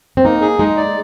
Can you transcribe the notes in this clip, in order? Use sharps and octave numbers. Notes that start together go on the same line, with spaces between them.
C4
A#3 D#4
G#4
G#3 D#4
D5